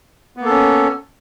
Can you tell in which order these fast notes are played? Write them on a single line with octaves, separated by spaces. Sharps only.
B3 A#3 A4 C#4